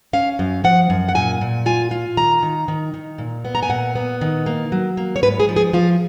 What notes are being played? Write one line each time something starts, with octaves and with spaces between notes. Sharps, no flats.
C#4 F5
F#2
F3 F#5
F#2
F#5
A#2 G#5
A#2
F4 G#5
F4
D#3 A#5
D#3
D#3
D#3
A#2
B3
A#5
G#5
A#2 F#5
B3
D#3
A#3
F#3
A#3
C#5
G#2 B4
G#4
F3
G#4
F3 F4